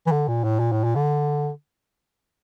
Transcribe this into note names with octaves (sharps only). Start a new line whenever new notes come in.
E3
D3
A#2
A2
A#2
A2
A#2
D3